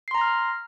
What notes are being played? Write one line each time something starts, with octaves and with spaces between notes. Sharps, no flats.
A#5 C6 F6 A#6 C7